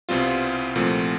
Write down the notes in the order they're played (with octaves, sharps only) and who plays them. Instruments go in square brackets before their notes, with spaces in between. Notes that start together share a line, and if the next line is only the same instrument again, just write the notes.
[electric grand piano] C2 B2 G3 C4 F4
C2 A#2 F3 A3 C4